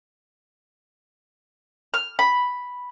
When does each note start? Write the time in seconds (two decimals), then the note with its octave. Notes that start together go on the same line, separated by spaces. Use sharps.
1.94 F6
2.19 B5